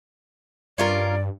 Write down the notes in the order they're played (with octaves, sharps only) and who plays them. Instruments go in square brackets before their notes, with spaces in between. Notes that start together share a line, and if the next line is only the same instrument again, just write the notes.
[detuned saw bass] G2 [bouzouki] C#4 F4 A#4 [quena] D5